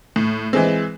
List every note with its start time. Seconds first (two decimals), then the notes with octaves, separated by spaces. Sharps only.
0.16 A2
0.53 E3 G#3 C4